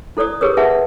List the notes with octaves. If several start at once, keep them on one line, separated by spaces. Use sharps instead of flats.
E4 A4 C5 D5 D#6
G4 G#4 A#4 B4 C#5 D#6
G#4 B4 E5 F#5 A5